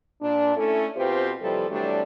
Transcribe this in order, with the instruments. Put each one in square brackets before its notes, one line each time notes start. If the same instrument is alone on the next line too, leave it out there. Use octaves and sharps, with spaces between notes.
[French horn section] A#2 D4
A3 C#4 E4 A4
B2 C4 F4 G4 B4 C5
D#2 C3 E3 F3 G3 A4
C3 E3 F#3 G3 A3 D4